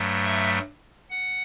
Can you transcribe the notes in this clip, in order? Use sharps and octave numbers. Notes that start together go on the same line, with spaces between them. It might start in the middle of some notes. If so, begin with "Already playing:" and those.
Already playing: G2 F#3 A3
E5
F#5